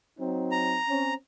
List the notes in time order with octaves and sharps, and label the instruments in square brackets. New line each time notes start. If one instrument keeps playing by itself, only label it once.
[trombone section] F#3 C4 D#4
[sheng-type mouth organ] A#5
[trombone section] C4 C#4